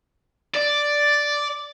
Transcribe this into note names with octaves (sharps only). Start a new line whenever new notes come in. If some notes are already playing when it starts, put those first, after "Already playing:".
D5